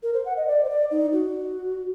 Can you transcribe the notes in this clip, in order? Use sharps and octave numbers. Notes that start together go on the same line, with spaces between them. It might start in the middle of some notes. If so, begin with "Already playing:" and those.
A#4
C5
F#5
D#5
D5
C5
D5
D#4
F#4